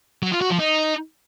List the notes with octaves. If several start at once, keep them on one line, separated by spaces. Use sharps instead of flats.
F#3
F4
F#4
F3
D#4